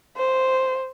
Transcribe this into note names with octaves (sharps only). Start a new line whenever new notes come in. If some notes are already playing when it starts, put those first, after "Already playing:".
C5